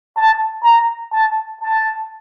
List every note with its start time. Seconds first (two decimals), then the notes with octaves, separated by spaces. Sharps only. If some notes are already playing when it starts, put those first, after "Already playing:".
0.16 A5
0.64 A#5
1.12 A5
1.60 A5